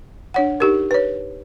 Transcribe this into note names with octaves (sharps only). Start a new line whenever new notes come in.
D4 C#5 F#5
D#4 G4 A#4
B4 C#5